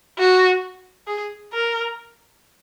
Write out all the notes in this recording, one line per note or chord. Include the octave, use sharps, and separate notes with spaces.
F#4
G#4
A#4